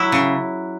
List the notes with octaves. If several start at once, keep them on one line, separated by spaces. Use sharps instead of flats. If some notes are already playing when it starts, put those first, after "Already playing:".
Already playing: F#3 E4
C#3